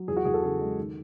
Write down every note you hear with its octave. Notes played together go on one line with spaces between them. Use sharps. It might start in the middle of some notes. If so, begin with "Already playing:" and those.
Already playing: F#3
E2 G#4
F#4
E2 G#4
A4
C#3 G#4
G#3
D#3